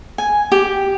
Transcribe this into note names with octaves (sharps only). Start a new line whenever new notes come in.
G#5
G4